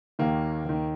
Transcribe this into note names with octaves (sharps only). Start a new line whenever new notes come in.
D#2 D#3 A#3
D#2 D#3